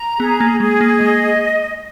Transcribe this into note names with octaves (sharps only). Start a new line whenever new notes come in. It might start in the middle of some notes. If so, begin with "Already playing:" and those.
Already playing: A#5
B3 G#4
A#3
G#3 G#4
A#3
G#3 D#5